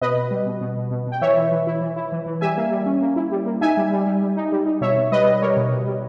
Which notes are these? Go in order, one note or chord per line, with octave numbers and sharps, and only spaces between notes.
B2 B4 D#5
B2
G3
B2
B2
B2
B2
B2
G5
E3 C#5 E5
E3
E3
E4
E3
E4
E3
E3
G3 E5 G#5
A#3
G3
C#4
A#3
E4
G3
A#3
D#4 E5 G#5
G3
G3
G3
G3
D#4
G3
D#4
B2 C#5 E5
B2
G3 B4 D#5
G3
G3 A#4 C#5
B2
B2
G3